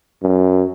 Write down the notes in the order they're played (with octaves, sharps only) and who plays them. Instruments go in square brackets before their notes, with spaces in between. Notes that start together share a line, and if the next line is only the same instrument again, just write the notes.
[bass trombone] F#2